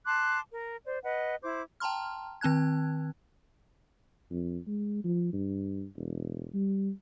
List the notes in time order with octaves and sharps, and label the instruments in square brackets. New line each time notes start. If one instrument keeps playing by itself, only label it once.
[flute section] A5 C6 D6 F#6
A#4
C5 D5
B4 D#5 F#5
E4 C5 D6
[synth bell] G5 A5 A#5 C6 F6
D#3 C4 A5 F#6 G#6
[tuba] F2
G#3
F3
G2
E1
G3